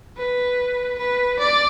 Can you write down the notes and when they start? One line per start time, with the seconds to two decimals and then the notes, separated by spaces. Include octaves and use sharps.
0.17 B4
0.98 B4
1.39 D5